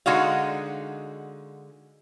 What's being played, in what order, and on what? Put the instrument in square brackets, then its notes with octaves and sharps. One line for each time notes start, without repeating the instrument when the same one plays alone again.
[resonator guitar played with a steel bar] D3 G#3 D#4 F#4 F5